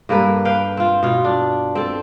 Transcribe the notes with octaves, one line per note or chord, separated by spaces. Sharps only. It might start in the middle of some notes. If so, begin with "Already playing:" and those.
G2 A#3 A4 B4
B4 F5 G5
C4 F4
B2 F4
D4
C4 A4